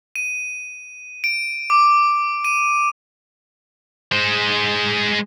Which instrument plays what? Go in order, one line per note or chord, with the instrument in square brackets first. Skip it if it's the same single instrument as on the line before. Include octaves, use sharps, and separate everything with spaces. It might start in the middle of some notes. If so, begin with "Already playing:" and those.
[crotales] D#7
D7
D6
D#7
[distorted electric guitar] G#3 C5